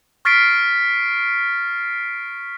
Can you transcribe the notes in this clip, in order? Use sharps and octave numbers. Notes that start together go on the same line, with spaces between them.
C#6 F6 A6 B6 C7 D7